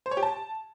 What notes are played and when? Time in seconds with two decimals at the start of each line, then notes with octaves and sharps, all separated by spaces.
0.06 C5
0.11 C#5
0.17 G4
0.23 A5